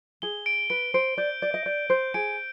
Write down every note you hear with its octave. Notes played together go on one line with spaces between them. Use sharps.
G#4 G7
D7
B4 D7
C5 D7
D5 G6
D5 G6
D#5
D5 G6
C5 G6
G#4 D7